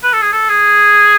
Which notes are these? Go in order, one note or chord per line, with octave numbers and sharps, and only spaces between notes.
B4
A4
G#4
A4
G#4